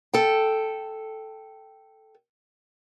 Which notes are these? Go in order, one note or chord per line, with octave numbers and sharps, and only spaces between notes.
A4 G5